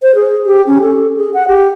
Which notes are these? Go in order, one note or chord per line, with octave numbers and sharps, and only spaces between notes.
C5
G#4
G4
C#4
A4
G#4
F#5
G4